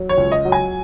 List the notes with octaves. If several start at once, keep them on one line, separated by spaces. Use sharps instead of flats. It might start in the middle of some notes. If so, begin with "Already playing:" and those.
Already playing: F#3
C#5
C#2
D#5
F#3
G#5